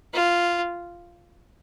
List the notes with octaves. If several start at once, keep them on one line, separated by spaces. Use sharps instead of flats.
F4